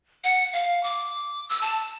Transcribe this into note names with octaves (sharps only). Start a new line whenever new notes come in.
F#5
F5
D6
E6
A5